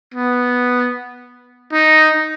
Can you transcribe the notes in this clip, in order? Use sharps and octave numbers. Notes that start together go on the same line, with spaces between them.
B3
D#4